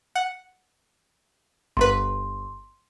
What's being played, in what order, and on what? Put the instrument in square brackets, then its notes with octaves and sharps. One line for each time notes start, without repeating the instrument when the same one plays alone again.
[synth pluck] F#5
[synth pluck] G1 B4 [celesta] C6